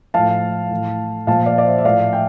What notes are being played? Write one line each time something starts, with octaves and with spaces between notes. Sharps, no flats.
A2 F3 F5 A5
A2 E3
A#2 F3 F5 A5
D5 F5
D5
C5 E5
E5
A2 F3 D5 F5
E5 G5